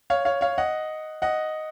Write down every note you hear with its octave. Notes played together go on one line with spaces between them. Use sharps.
C#5 F5
C#5 F5
C#5 F5
D#5 F#5
D#5 F#5